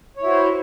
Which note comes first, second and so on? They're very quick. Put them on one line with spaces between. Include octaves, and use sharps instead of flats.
C#5 E4 F#4 C5